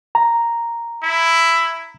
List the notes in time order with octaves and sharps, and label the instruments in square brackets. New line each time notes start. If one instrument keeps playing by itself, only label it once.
[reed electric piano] A#5
[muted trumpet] E4